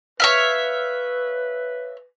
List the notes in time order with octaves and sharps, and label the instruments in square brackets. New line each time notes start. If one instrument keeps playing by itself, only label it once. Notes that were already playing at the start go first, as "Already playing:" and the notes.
[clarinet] B4 [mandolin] C#5 E5 F5